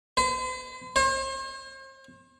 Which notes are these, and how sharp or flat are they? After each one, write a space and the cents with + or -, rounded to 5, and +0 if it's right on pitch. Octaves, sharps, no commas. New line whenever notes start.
C5 -45
C5 +40